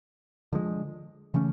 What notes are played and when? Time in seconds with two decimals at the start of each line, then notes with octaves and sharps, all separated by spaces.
0.53 D3 F3 G#3
1.34 C#3 E3 A3 C#4